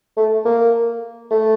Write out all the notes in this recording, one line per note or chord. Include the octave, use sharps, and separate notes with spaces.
A3
A#3
A3